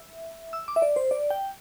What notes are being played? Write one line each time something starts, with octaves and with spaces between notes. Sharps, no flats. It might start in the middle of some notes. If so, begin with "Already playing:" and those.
Already playing: E5
E6
D6
E5
D5
C5
D5
G5